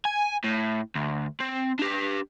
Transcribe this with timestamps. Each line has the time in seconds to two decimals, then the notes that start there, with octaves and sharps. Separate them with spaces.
0.05 G#5
0.44 A2
0.95 D2
1.40 C4
1.79 D4 G4